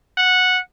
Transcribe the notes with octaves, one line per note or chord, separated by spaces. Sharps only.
F#5